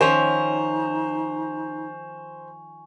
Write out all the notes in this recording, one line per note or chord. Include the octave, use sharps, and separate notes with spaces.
D#3 F3 C#4 D#4 C5 G#5 C#6 F7